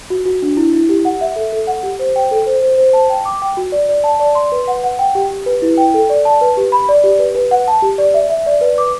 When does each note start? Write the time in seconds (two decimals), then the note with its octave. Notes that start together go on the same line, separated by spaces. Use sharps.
0.10 F#4
0.25 F#4
0.42 D4
0.57 E4
0.73 E4
0.89 G4
1.05 F#5
1.21 E5
1.36 A4
1.53 A4
1.67 F#5
1.83 G4
1.99 C5
2.16 G5
2.31 A4
2.47 C5
2.63 C5
2.78 C5
2.93 A5
3.10 G5
3.25 D6
3.42 G5
3.57 F#4
3.72 D5
3.89 D5
4.04 A5
4.20 D5
4.35 C6
4.52 B4
4.68 F#5
4.84 F#5
4.99 G5
5.15 G4
5.31 G4
5.46 B4
5.62 E4
5.77 G5
5.94 A4
6.10 D5
6.25 A5
6.41 B4
6.57 G4
6.72 B5
6.89 D5
7.04 G4
7.19 B4
7.35 B4
7.51 F#5
7.68 A5
7.82 G4
7.98 D5
8.14 E5
8.30 E5
8.46 D5
8.61 B4
8.78 D6